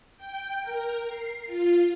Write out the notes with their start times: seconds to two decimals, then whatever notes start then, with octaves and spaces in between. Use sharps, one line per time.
0.17 G5
0.62 A#4
1.08 C7
1.46 F4